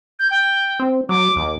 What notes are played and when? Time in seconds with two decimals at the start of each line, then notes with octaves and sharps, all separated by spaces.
0.19 G6
0.31 G5
0.80 C4
1.09 F#3 D6
1.36 D#2